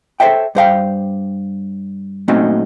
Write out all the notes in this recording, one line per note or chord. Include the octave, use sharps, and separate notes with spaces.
A4 C5 C#5 E5 G5
G2 C5 F5 G5
A#2 F#3 A3 C4 C#4 D#4